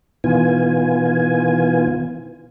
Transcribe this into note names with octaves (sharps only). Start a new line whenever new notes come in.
B2 D#3 E3 B3 F4 G#5